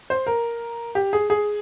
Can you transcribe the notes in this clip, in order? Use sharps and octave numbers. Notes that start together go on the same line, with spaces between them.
C5
A#4
G4
G#4
G#4